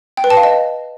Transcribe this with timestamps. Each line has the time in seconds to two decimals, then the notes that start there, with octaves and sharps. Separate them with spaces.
0.17 G5
0.24 B4
0.30 A5
0.37 F5
0.43 D#5